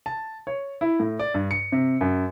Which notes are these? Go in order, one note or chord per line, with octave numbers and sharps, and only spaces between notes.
A5
C#5
E4
A2
D5
G2
C#7
C3
F#2